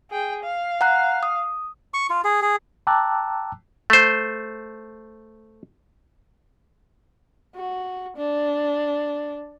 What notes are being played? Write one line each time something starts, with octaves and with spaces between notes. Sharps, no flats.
G#4 G5
F5
F#5 A#5 F#6
D#6
C#6
F4
G#4
G#4
G5 A5 A#5 D6 E6 F#6
A3 C5
F#4
D4